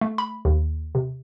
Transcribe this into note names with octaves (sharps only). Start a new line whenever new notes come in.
A3
B5
D#2
C3